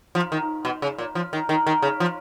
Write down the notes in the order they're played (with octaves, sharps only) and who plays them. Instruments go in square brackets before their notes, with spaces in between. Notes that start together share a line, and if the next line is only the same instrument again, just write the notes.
[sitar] F3
D#3
B2
C#3
A#2
F3
D#3
D#3
D#3
C#3
F3